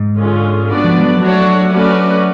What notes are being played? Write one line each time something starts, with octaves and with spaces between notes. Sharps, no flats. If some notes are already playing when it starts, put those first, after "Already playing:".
Already playing: G#2
D3 G#3 C#4 F4 G#4
B3 D4 F#4 B4 D5
F3
G#3
F#3
A3 D4 F#4 C#5
A3 C#4 F#4 B4 D5